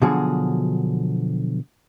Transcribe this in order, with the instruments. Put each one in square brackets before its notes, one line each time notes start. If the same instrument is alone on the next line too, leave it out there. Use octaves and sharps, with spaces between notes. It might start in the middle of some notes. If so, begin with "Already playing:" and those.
[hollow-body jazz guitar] B2 D3 F3 F#3 F#4 G#4